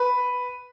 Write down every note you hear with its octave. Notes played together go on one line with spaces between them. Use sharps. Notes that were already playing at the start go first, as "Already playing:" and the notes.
Already playing: B4